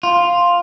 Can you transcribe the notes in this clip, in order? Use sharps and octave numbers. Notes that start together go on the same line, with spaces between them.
F4